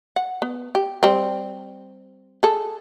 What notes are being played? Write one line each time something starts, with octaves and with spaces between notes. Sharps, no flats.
F#5
B3
G4
G3 C4
G#4 A4